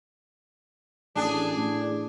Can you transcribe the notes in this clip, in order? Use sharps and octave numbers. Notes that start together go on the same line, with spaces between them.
A1 D4 G#4
A2